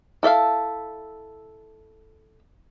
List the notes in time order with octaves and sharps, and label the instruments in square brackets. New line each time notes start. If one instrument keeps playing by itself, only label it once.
[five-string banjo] E4 A4 E5 F5